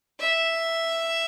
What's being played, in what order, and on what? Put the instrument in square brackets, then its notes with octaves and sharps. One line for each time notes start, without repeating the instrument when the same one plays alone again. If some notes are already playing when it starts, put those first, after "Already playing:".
[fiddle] E5